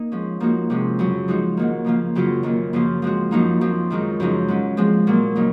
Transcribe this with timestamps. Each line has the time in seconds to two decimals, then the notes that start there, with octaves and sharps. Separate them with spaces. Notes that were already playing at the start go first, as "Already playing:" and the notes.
Already playing: A#3 D#4
0.12 F3 G#3 C#4
0.40 F3 A#3 D#4 F#4
0.70 C3 F3 G#3 C#4
0.99 F#2 C#3 F#3
1.28 F3 G#3 D#4 F#4
1.57 G#2 D#3 F#3 A#3
1.84 C#3 F3 A#3 F4
2.15 F#2 C#3 F#3 C4 F4
2.43 F#2 D#3 F#3 A#3
2.73 F#2 C#3 F3 A#3 F4
3.02 F3 G#3 C4 F#4
3.31 F#2 F3 A#3 D#4 F#4
3.61 F#2 F3 C4
3.90 F#2 D#3 G#3 D#4
4.20 F#2 C#3 F3 G#3 D#4
4.48 G#2 F#3 C#4
4.77 F3 G#3 C4
5.07 A#2 F#3 A#3
5.36 C#3 F#3 A#3 D#4